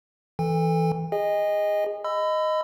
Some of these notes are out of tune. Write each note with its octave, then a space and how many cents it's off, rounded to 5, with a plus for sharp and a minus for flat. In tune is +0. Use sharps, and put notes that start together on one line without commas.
E3 +0 A4 +0 G#5 -45
G#4 -20 D#5 +0 G#5 -35
D#5 +0 B5 +30 E6 +15